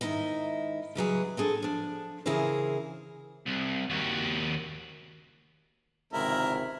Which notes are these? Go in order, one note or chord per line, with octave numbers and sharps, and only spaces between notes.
G#2 D#3 C#4 D#4 E4 D#5
C#3 E3 F#3 G#4
C4 D4 G#4 A4
F3 D4
C#3 E3 E4 G#4 A#4 C5
C2
D#2 F#4
G#1 C#2 C3 E4 A#4